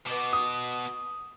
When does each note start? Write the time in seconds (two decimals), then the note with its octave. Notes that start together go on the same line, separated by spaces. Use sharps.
0.07 B2 B3 D#5 D6
0.33 D#6